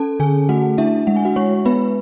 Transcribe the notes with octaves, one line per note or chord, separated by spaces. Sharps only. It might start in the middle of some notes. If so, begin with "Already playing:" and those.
Already playing: C#4 A4 A5
D3 G#4 G#5
A3 F#4 F#5
D4 E4 E5
G#3 F#5
G#5
F#4 F#5
G#3 C#5 C#6
B3 B4 B5